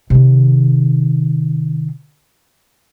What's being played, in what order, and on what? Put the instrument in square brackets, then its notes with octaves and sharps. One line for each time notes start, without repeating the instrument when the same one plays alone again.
[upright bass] C3 D#3